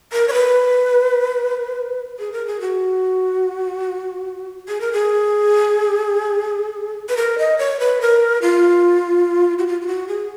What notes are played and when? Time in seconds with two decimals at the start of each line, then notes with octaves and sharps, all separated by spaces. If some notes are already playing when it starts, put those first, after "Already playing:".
0.13 A#4
0.28 C#5
0.33 B4
2.19 G#4
2.32 A#4
2.47 G#4
2.61 F#4
4.68 G#4
4.81 A#4
4.93 G#4
7.09 B4
7.17 A#4
7.38 D#5
7.58 C#5
7.80 B4
8.01 A#4
8.42 F4
9.59 F#4
9.67 F4
9.81 F4
9.87 F#4
10.08 G#4